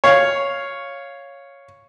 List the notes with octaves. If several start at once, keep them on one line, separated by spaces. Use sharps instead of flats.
C#5 F5